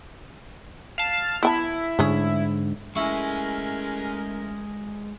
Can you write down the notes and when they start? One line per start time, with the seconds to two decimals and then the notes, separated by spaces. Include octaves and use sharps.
0.98 F5 A5
1.43 B3 E4 G5 A5
1.99 G#2 D3 A3 C#4 G#4
2.96 G#3 A3 C#4 E4 G#4 A#4 C#6